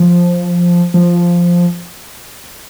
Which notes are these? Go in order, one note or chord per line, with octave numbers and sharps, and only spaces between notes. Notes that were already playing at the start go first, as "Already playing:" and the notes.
Already playing: F3
F3